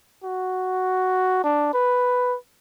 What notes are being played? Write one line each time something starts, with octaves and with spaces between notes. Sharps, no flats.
F#4
D4
B4